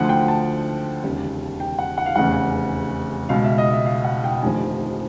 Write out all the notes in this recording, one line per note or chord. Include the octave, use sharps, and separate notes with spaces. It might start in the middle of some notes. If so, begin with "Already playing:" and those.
Already playing: D2 D3 F3 F#5
G5
A5
E1 D#2 C#3
G5
F#5
F#5
F5
F1 E2 C#3 F#5
C#2 B2 F5
E5
D#5
E5
F5
F#5
G5
F1 D#2 D3 F3 G#5